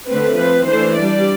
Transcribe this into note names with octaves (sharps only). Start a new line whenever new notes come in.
D3 A3 C4 B4
F3 C4 B4
E3 A3 D4 C5
G3 D4 D5